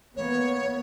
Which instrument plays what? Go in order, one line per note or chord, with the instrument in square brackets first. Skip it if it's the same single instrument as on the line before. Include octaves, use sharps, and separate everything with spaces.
[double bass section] E3 A#3 B3 [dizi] C#5